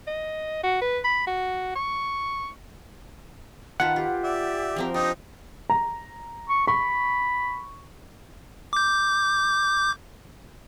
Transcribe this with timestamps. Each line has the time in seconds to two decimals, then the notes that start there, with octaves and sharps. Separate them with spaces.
0.07 D#5
0.63 F#4
0.81 B4
1.04 B5
1.27 F#4
1.76 C#6
3.80 D#3 F4 B4 F#5 A5
3.96 F4 G4
4.24 D5 E5
4.76 F3 C4 A#4
4.94 D4 D#4 G4 D#6
5.70 A#5
6.49 C#6
6.67 B5 C#6
8.73 D6 G6